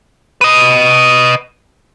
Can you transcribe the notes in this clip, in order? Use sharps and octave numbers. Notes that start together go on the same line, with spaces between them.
B4 D#5